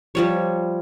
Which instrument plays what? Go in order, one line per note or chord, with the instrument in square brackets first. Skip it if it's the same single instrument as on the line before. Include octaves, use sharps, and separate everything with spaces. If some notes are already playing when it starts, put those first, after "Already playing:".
[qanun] F3 G3 C#5